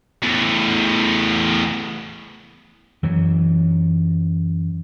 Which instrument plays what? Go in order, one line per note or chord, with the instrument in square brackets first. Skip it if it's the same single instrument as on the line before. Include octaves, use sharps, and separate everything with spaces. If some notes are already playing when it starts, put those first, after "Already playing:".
[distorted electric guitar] E2 A2
[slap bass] F#2 E3 F#3